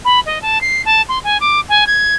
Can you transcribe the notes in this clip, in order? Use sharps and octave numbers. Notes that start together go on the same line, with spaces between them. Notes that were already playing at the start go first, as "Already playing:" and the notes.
B5
D#5
A5
C7
A5
C6
G#5
D6
G#5
G#6